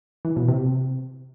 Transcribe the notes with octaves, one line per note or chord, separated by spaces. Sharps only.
E3
B2
C3